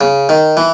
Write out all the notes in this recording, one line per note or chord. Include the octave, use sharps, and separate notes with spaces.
C#3
D#3
E3